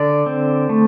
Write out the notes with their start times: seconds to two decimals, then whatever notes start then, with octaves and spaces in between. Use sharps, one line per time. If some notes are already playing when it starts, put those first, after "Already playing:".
Already playing: D3 D5
0.26 C4
0.69 A3